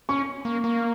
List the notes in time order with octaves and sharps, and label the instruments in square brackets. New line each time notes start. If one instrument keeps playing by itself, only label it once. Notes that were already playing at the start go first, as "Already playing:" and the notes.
[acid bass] C#4 [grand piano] C#6
[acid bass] A#3
A#3